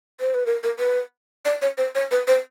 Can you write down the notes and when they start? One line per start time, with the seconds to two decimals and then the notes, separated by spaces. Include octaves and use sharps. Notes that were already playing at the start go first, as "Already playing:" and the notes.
0.21 C5
0.34 B4
0.46 A#4
0.63 A#4
0.79 B4
1.45 D5
1.62 C#5
1.78 C5
1.95 C#5
2.11 B4
2.27 C5